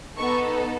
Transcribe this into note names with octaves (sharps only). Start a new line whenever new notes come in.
B3 D#4 A4 C#6